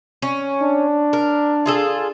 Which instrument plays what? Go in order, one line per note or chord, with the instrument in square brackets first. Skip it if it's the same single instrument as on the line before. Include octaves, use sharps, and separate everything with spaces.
[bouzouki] C#4
[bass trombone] D4
[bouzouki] A#4
F4 G#4 A4